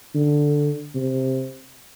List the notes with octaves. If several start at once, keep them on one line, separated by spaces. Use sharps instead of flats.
D3
C3